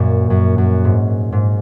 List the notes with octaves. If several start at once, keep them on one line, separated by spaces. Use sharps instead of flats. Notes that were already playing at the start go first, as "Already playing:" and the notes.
Already playing: F#2 A#2
F#2
F#2
G#2
G#2